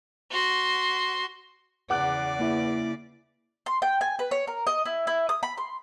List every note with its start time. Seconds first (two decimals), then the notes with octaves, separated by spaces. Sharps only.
0.31 F#4 C6
1.90 E2 C#3 D5 F#5 D6 F#6
2.40 A#3 E4 E5
3.66 C6
3.82 G5
4.01 G#5
4.19 B4
4.31 C#5
4.47 A#4
4.67 D#5
4.85 E4
5.07 E4
5.29 D#6
5.43 B5
5.57 C6